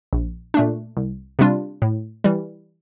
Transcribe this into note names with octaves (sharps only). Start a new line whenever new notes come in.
A#1
A#2 A3 D4
C2
C3 G3 D4 F4
A2
E3 G3